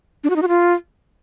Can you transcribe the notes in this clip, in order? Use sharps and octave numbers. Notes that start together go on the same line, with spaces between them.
D4
F#4
D#4
F#4
F4